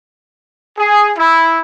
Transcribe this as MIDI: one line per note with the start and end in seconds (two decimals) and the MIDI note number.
0.79 1.12 68
1.18 1.59 64